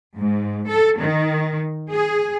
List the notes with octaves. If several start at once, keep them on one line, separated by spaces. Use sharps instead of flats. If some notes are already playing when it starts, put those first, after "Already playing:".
G#2
A4
D#3
G#4